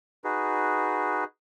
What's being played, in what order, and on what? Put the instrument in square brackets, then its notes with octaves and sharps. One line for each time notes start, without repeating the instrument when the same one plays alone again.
[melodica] D#4 F#4 G#4 B4